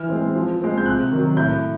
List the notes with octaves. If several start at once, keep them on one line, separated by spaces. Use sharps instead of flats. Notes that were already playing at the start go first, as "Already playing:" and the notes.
Already playing: E3 F6
G#3 C4
F3
G#3 C4
G6
C3 F#6
D#3 F#3
A2 G6